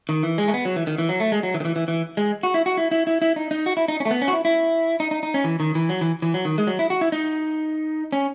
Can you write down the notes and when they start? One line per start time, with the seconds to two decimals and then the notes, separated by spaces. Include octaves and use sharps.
0.09 D#3
0.23 E3
0.38 G#3
0.48 A3
0.54 B3
0.65 F#3
0.76 E3
0.87 D#3
0.98 E3
1.09 F#3
1.20 A3
1.32 G#3
1.43 F#3
1.54 E3
1.60 D#3
1.65 E3
1.76 E3
1.88 E3
2.17 G#3
2.43 F#4
2.54 E4
2.66 F#4
2.77 E4
2.91 E4
3.07 E4
3.22 E4
3.36 D#4
3.51 D#4
3.66 F#4
3.77 E4
3.88 D#4
4.00 C#4
4.05 A3
4.11 B3
4.22 C#4
4.28 F#4
4.33 E4
4.45 E4
5.00 D#4
5.11 D#4
5.23 D#4
5.34 C#4
5.44 E3
5.60 D#3
5.75 E3
5.89 F#3
6.01 E3
6.22 E3
6.34 F#3
6.45 D#3
6.58 G#3
6.67 F#3
6.79 E4
6.90 F#4
7.01 E4
7.12 D#4
8.13 C#4